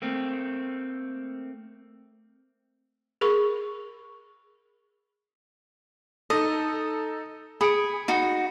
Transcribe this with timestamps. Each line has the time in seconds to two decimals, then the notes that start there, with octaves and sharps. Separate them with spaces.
0.02 A3 A#3 C4
3.21 G#4 A#4 B5 C#6
6.30 D#4 A4 D#5
7.61 G#4 B5 C#7 D7
8.08 D#4 F#4